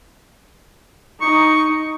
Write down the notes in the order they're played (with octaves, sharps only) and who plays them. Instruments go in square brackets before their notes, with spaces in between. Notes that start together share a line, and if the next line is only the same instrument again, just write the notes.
[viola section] D#4 [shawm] C#6